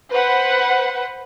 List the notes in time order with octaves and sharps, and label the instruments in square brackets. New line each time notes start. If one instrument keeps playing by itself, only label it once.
[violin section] B4 C5 F#5